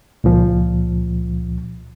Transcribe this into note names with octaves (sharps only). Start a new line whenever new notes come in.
C#2 A#2 F3